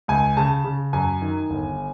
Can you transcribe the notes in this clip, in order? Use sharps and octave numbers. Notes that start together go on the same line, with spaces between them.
C#2 G#5
C#3 A5
C#3
F#2 G#5
D#3
G1